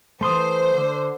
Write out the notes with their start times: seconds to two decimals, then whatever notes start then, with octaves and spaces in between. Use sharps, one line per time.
0.21 E3 A3 C5 C6 D#6
0.73 D3